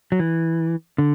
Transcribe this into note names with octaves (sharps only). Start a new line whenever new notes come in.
F#3
E3
D3